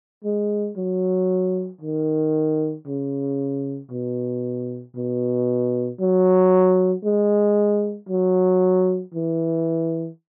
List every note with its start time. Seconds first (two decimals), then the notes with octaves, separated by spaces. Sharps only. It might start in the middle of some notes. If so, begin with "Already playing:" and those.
0.24 G#3
0.77 F#3
1.81 D#3
2.86 C#3
3.90 B2
4.96 B2
6.00 F#3
7.04 G#3
8.09 F#3
9.14 E3